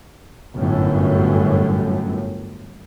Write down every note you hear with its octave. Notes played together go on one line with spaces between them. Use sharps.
G1 F#2 A2